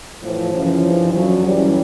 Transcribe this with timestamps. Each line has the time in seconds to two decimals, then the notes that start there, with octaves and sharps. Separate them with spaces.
0.22 A2 E3 F3
0.53 F#2 C#3 E3 F3
0.84 G2 E3
1.14 F#2 D3 F#3
1.45 F#2 C#3 E3 G3